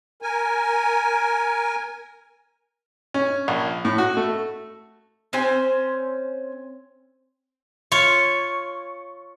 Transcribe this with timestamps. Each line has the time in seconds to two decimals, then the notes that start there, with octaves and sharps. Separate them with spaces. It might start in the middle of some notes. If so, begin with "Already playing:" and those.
0.22 A#4 G#5
3.14 C#4
3.48 A#1
3.85 A2
3.98 F#4
4.17 A3
5.33 C4 C#4 C5 G#5
7.92 F4 C#5